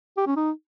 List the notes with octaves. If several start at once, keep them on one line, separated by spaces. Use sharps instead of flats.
G4
C#4
D#4